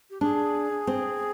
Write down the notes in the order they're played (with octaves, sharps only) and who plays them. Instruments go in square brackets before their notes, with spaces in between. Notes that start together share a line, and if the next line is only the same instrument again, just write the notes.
[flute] G4
[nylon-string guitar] D4 [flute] G#4
[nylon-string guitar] C4